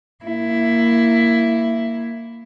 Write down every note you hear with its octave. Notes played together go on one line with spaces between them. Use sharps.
A#3 E4